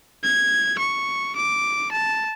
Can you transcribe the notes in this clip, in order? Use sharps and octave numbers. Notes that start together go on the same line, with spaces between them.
G#6
C#6
D6
A5